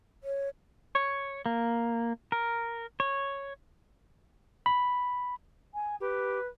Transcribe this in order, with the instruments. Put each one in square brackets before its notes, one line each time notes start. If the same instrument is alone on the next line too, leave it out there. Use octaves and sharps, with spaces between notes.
[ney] C#5
[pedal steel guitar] C#5
A#3
A#4
C#5
[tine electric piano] B5
[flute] G#5
[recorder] G4 [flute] B4